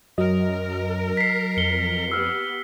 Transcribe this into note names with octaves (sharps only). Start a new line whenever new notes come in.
F#2 F#3 A#4 D#5
B6 C7
F2 C#7 G7
B3 G4 E6 F6